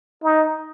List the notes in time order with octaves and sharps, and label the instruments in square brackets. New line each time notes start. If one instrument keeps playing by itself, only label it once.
[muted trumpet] D#4